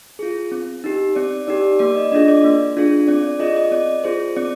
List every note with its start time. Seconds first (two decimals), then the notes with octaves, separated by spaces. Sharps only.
0.19 F4 G#4
0.52 C4
0.84 D#4 G4
1.15 C4 D5
1.47 D#4 G4 D5
1.79 A#3 D5
1.95 D#5
2.12 D4 F4 G#4 D#5
2.28 D5
2.44 A#3
2.76 D4 F4 G#4
3.07 C4 D5
3.24 D5
3.40 F4 G#4 D#5
3.56 D#5
3.72 C4 D5
4.04 F4 G#4 C5
4.36 C4 D5